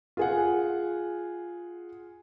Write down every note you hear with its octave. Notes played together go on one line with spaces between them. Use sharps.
F4 G#4 F#5